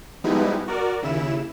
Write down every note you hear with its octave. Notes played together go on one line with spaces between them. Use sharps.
F3 G3 G#3 B3 D#4 E4
F#4 A#4 D5
D#2 C#3 E4 E7